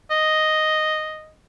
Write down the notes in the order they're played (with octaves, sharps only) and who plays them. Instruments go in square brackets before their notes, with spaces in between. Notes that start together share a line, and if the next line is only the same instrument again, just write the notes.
[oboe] D#5